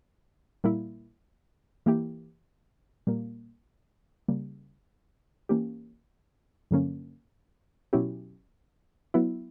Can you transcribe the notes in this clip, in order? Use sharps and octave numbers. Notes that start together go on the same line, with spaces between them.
A#2 G3 A#3 E4
E3 A#3 E4 G4
A#2 G3 A#3
C#3 G3 A#3
E3 A#3 C#4 G4
G2 D3 F#3 A#3 C#4
B2 F#3 C#4 E4 G4
F#3 B3 E4